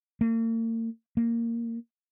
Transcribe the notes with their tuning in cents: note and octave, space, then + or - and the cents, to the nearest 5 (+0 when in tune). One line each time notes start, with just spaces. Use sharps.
A#3 -45
A#3 -10